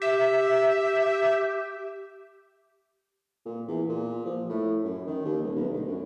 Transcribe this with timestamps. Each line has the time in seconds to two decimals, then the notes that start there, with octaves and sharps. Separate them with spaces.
0.02 G4 E5
3.45 A#2
3.67 E2
3.89 A#2
4.25 F3
4.49 A2
4.84 F#2
5.07 D#3
5.25 D#2
5.42 D#1
5.56 B1
5.73 D2
5.87 F#2